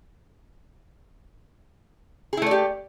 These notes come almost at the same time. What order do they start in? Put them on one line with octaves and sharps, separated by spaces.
G#4 E4 A3 D5 G4